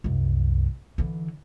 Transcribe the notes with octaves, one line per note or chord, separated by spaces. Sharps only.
C2 F#2
D3 E3